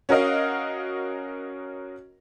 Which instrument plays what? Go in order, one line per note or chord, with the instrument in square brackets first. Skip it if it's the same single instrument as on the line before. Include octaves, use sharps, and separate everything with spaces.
[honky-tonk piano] C#4 F#4 A#4 D#5 F5